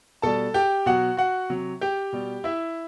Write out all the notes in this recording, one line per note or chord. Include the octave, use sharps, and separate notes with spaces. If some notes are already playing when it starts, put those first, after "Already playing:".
B2 G3 A4 A5
G4 G5
B2 F#3 F#4 F#5
F#4 F#5
C3 F#3
G4 G5
B2 G3
E4 E5